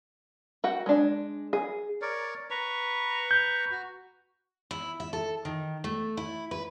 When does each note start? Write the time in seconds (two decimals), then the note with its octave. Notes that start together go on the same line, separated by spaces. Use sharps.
0.64 F#4 F#5 G5
0.86 G#3 D4
1.53 G#4
2.02 A#4 C#5 D5
2.50 B4 A#5 C#6
3.31 G6
3.71 F#4
4.71 E4
5.00 E5
5.13 A4
5.45 D#3
5.84 A3
6.17 E4
6.51 B4